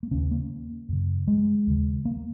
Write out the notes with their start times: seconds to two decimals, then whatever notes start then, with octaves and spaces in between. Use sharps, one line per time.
0.03 A#3
0.11 D#2 C#3 C#4
0.31 A#3
0.89 F#2 C#3
1.28 G#3
1.67 D#2 C#3
2.05 A#3